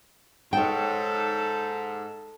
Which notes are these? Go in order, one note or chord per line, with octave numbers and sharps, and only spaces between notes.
G#2 D#4 A4 C#5 G5